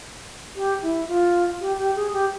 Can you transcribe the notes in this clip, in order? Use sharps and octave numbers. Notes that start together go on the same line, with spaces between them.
G4
E4
F4
G4
G4
G#4
G4